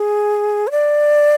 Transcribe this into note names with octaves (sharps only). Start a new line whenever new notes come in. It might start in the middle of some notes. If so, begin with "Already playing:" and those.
Already playing: G#4
C#5
D5